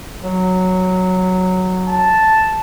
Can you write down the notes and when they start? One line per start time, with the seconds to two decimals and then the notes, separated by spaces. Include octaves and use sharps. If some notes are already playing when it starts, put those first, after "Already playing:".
0.23 F#3
1.88 A5